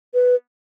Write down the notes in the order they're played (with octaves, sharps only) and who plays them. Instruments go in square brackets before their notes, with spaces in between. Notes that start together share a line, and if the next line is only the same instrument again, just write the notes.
[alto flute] B4